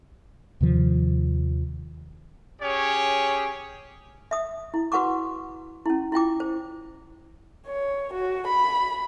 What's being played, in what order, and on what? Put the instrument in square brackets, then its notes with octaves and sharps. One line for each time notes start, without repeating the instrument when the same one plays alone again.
[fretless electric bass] D#2 C3 D#3 F3
[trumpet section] C#4 G4 G#4 C#5
[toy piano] E5 D#6
E4
F#4 B4 F#5 C#6 D6
C#4 E4
E4 F4 G5 D6
C5
[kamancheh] C#5
F#4
B5